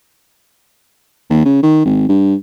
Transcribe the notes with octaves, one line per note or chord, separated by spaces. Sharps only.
D#2
C#3
D#3
G#1
G2